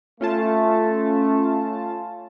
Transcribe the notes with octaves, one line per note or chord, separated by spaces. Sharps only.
A3 C#4 F4 A5